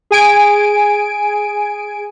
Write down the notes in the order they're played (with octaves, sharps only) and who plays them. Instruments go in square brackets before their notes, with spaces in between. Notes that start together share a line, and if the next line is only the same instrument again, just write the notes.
[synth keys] G#4 G#5 D7